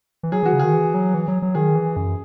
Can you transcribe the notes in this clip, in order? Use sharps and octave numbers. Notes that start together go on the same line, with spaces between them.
E3
F#3 G#4
E3 F#4
C#3
D#3 G#4
E3
F#3
E3
F#3
F#3
D#3 G#4
E3
F#2